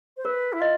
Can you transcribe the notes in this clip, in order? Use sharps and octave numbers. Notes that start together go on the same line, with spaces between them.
C5
A#4 B4
E4
F4 D#5